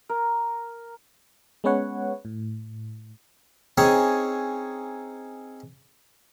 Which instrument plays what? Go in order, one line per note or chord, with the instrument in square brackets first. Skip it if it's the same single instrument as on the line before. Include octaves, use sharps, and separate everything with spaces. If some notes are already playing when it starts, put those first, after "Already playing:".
[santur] A#4
[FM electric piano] G#3 B3 C#4 B4 C#5 F#5
A2
[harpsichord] C4 C#4 D#4 G#4 C#5